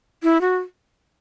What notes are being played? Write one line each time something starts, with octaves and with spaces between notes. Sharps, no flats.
E4
F#4